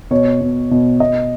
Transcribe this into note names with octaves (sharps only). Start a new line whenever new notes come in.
B2 C#5
B2
B2
B2 D#5